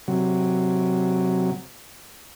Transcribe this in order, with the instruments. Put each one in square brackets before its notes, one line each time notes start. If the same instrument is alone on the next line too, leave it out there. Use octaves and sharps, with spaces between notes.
[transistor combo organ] C3 F#3